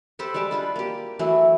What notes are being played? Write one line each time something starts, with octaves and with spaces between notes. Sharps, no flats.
G4 A4 B4 C5
G3 G#3 G4 A5
D4 F4 B4
A#3 G4
E3 F#3 A3 E4